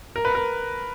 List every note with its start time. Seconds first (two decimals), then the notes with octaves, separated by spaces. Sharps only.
0.16 A#4
0.25 B4
0.35 A#4